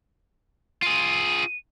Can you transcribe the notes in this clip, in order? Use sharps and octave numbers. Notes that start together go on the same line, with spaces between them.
F4 G#4 D#7